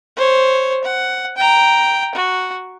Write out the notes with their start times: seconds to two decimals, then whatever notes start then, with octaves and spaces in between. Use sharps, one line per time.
0.16 C5 C#5
0.84 F#5
1.37 G5 A#5
2.15 F#4